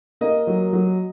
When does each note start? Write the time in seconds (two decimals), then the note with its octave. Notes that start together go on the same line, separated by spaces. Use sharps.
0.21 A#3 D#5
0.47 F#3
0.73 F#3